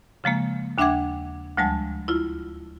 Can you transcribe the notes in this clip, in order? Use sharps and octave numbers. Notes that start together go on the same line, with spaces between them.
C#3 F3 G#3 A#3
D#2 D4 E5 F#5 D6 G#6
D2 F3 G3 G#3 A5
E4 F4